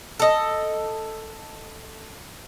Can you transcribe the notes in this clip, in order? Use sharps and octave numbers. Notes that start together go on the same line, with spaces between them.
A4 D#5